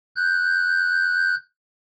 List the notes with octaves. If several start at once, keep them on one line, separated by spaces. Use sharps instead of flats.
F#6 G6